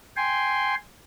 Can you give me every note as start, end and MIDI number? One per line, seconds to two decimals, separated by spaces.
0.16 0.75 79
0.16 0.75 80
0.16 0.75 84